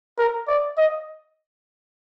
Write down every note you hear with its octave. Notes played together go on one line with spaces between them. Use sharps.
A#4
D5
D#5